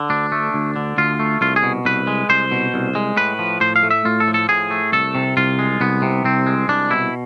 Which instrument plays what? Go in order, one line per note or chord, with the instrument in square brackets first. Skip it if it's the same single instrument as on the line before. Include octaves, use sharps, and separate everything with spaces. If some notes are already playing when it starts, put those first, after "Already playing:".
Already playing: [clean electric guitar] D3
D2 D4
A3
D2
D3
D2 F4
A3
C2 F4
G#4
B2
C2 B4
G#3
C2 C5
B2
C2
G#3
A2 B4
F3
A2 C5
F5
A3
E5
A2 F4
A4
F3
A4
A2 G#4
A3
C2 A4
C3
C2 F4
G#3
C2 B3
C3
C2 C4
G#3
C2 D4
B2 E4